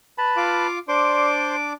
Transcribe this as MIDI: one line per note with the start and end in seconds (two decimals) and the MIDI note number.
0.18 0.67 71
0.18 0.67 81
0.18 0.67 83
0.37 0.79 65
0.37 0.79 77
0.37 0.79 86
0.88 1.73 62
0.88 1.56 72
0.88 1.73 74
0.88 1.56 84
0.88 1.73 86